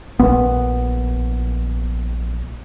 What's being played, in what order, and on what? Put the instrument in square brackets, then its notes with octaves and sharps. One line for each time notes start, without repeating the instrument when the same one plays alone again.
[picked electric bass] A#1 B3